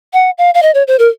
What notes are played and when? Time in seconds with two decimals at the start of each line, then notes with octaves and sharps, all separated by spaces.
0.13 F#5
0.38 F5
0.54 F5
0.63 D#5
0.75 C#5
0.87 C5
0.99 A#4